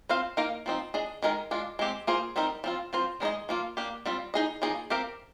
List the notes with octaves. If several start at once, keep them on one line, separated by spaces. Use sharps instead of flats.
C4 F4 C5 F5
A#3 D#4 A#4 F5
F3 C4 D#4
D4 G#4 D#5
D#3 G#3 D#4 A#4
G#3 D4 F4
G#3 C4 G4
A#3 F4 G#4 C5
G3 C4 D#4 A#4
F3 C4 F4
F3 C4 F4 C5
D#3 G#3 D#4 G#4 D#5
F3 A#3 F4
A#3 D4 G4
G3 C4 F4
D#4 G#4 D#5
F3 A#3 D#4 G#4 D#5
C4 G4 A#4 F5